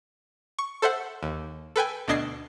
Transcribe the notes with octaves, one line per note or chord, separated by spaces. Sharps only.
C#6
A4 C5 E5 F#5
D#2
A4 B4 G5 G#5
D2 B2 D4 D#5 G#6 C7